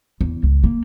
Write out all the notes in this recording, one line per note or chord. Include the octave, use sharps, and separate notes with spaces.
E2
C#2
A#3